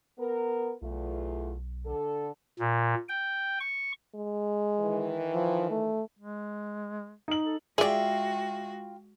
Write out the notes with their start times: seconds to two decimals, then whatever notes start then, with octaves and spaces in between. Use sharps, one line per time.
0.18 B3 A#4
0.82 B1 E2 A3 F4
1.85 D3 A4
2.59 A#2
3.09 G5
3.60 C#6
4.15 G#3
4.80 D#3 E3
5.34 F3
5.70 A3
6.19 G#3
7.28 D#4 F#7
7.45 A4
7.78 G#3 F4 F#4 G#4 D5 E5 F5 G5